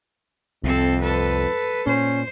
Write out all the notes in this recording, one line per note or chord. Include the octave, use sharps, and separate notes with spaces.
C2 F2 C4 A4
A4 B4
A#2 C#4 C5